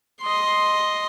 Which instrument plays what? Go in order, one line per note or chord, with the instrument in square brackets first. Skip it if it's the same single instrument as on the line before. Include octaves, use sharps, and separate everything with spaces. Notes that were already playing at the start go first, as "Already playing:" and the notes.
[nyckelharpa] D#5 C6